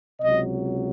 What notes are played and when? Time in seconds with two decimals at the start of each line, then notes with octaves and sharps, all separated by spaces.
0.20 C#2 C3 F#3 D#5